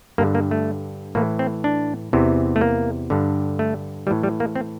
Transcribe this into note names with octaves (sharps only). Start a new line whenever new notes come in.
G2 D3 A#3
A#3
A3
A2 E3 A#3
C4
D4
E2 C3 E3
A3
A#3
G2 D3
A3
A2 E3 G3
G3
A#3
C4